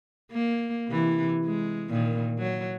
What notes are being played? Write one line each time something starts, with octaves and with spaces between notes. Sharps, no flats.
A#3
C3 E3
G#3
A#2 D#3
F#3